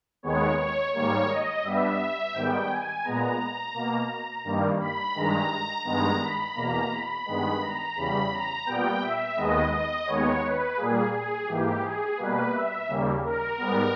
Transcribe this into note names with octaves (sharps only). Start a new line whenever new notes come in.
D#2 D#3 G#3 B3 C#5
C#5
G#2 D#3 G3 A#3 C#5
D#5
G2 G3 B3 E5
G#2 D#3 G3 B3 G5
G#5
A#2 G#3 B3 A#5
B2 A#3
G2 D#3 G3 A#3
B5
G2 D#3 G#3 A#5
G2 D#3 G#3 B3 A#5
B5
E2 B2 A#3 A#5
B5
G2 D#3 G#3 B3
A#5
E2 C#3 G3 B5
A#5
A#2 G3 B3 G5
E5
D#2 D#3 G#3 B3 D#5
D#5
D#2 D#3 G#3 B3 C#5
B4
A#2 G3 A#3 G#4
G#4
G#2 E3 A#3 G4
G#4
B2 G3 A#3 B4
E5
D#2 C#3 G3 A#3
A#4
G#2 G3 B3